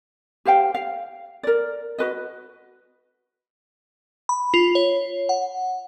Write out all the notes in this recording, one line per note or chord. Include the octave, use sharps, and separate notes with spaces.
G4 C5 F5 G5
F5
A#4 D5
F#4 B4 D#5
B5
F4
C#5
F#5